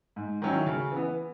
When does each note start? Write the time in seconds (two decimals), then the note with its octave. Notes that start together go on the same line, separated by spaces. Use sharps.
0.16 G#2
0.42 D#3 F#3 C#4 E4
0.66 C#3
0.92 E3 B3